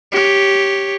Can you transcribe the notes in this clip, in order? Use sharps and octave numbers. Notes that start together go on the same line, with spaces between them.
G4 C#5